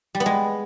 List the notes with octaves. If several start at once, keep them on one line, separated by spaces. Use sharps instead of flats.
G3
B3
G#3